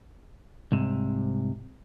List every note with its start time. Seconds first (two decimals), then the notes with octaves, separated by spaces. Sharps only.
0.72 C2 G#2 C3